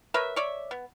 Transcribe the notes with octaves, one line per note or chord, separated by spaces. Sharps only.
A#4 B4 C#5 E5
C#5 D5 E5
B3